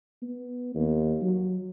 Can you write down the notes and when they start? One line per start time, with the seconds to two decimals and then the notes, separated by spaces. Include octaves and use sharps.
0.22 B3
0.75 D#2
1.22 F#3